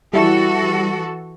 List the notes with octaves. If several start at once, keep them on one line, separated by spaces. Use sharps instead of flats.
E3 G3 E4 F#4 A4